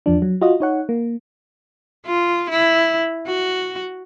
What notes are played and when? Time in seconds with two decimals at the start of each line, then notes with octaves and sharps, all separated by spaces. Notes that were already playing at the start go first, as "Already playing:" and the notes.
0.06 E2 F3 D4
0.22 F#3
0.41 F4 F#4 D#5
0.60 D#4 C#5 F#5
0.89 A#3
2.06 F4
2.50 E4
3.27 F#4